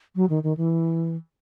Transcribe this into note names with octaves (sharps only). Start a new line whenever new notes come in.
F#3
D#3
D#3
E3